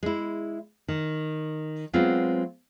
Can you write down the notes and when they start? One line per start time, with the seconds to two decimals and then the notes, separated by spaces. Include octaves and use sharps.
0.03 G#3 E4
0.88 D#3
1.93 F#3 G#3 B3 C4 F4